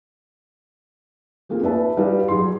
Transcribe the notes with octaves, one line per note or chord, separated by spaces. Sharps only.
A3 A#3 C4 F4 G#4
D#4 B4 E5 A5
G3 D#4 E4 B4 F5
F#3 D#4 G#4 C6